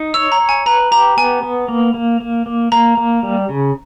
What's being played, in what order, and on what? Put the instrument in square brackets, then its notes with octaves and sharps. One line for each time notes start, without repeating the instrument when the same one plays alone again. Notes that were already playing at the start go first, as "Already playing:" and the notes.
Already playing: [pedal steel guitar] D#4
[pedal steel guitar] C#5 [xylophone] E6
[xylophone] A#5
[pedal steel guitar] C#5
[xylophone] G#5
[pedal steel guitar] B4 [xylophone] A#5
[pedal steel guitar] G4 [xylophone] A#5
[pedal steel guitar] B3 [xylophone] G#5
[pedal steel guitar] B3
A#3
A#3
A#3
A#3
[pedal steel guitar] A#3 [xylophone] A#5
[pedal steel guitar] A#3
G3
C#3